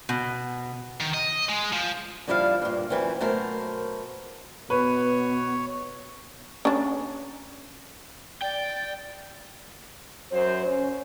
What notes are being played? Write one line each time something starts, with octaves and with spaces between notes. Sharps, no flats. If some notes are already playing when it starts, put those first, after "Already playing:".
B2
D#3
D#5
G#3
F3
D3 F3 G3 E4 D#5 F5
G2 A#2
F#2 E3 C4
B2 F#3 A3 A#4 C5
B2 B3 B4 C#5
C#4 D4
D5 G5
F#2 F#3 C5
C#4